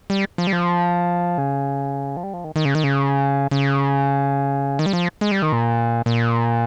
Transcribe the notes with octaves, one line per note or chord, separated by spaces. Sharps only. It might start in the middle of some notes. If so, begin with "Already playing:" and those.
G3
F3
G3
F3
C#3
F3
G3
F3
D#3
D#3
C#3
D#3
C#3
C#3
D#3
G3
F3
G#3
G3
D#3
A#2
A#2